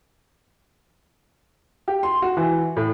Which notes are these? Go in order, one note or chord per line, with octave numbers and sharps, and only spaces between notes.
G4
C6
F#4
E3
A2